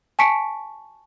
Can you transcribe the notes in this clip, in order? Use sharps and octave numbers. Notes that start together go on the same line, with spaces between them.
G#5 A5 C#6 B6 C#7 D7